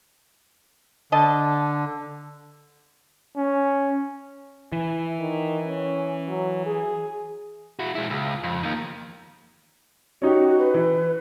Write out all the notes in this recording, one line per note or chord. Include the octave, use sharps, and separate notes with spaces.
D3 D#5 A5
C#4
E3 E4
D#3
C#4
F#3
G#4
E4 F#4
G#3 E4
C#2
F2
D#3 A#3
C#4 D#4 F#4 G4
B4
E3